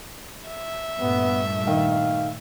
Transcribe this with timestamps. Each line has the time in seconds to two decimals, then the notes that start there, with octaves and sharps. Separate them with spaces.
0.47 E5
0.99 G2 A#2 A3 B3
1.67 D#3 F5